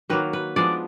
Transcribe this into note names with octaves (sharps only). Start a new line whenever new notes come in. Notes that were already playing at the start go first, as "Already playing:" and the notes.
D#3 F#3 A#3 B4
B4
F3 G#3 B3 D4 D5